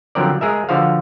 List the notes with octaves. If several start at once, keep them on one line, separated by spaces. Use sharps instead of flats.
D3 F3 F#3 C4 A#4 D5
G#3 G#4 A#4 E5
D3 F3 F#4 C5 F5